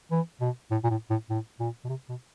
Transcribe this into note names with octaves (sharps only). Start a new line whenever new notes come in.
E3
B2
A2
A#2
A2
A2
A2
A#2
B2
C3
B2